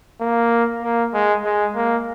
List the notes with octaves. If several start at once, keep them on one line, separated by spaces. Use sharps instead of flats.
A#3
A#3
G#3
G#3
A#3